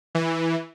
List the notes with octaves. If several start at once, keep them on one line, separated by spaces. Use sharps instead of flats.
E3